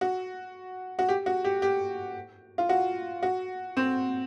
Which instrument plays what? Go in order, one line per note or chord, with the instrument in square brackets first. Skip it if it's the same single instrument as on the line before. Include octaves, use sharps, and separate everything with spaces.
[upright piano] F#4
F#4
G4
F#4
G4
G4
F4
F#4
F#4
C4